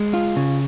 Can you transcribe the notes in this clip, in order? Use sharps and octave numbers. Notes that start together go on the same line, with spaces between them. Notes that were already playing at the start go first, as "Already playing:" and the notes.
Already playing: G#3
F4
C#3